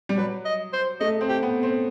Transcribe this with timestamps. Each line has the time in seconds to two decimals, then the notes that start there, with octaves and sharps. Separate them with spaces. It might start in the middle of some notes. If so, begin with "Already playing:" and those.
0.09 G3
0.17 F#3 B4
0.45 D#5
0.73 C5
1.00 A3 D#5
1.21 C4
1.28 G4
1.43 B3
1.63 C4